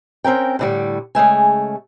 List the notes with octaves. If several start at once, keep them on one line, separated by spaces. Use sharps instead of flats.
C4 C#4 A#4 G5
A2 D3 G3
C#3 G#3 A3 G#5